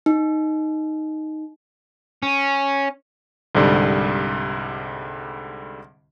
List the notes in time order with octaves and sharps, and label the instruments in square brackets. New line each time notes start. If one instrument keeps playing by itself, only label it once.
[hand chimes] D#4
[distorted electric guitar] C#4
[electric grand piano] C2 G#2 D3 G3